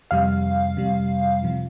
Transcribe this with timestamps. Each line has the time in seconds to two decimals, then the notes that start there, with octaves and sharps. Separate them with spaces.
0.11 F2 C3 G3 F5
0.77 F2 C3 G3
1.43 C3 F3